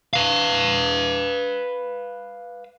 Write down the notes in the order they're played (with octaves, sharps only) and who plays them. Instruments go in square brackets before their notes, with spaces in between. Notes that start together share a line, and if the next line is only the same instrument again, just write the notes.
[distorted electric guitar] B4 F5